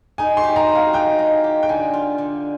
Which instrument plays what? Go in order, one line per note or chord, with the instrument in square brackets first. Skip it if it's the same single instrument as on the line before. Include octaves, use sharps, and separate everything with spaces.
[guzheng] D#4 [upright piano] G#5
[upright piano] C6
[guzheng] G4
[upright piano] A#5
[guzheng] G#3
[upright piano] F5
[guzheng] D#4 [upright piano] G5
[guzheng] G#3
G4
[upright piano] G5
[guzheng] D3 [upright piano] G#5
[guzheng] F4
D3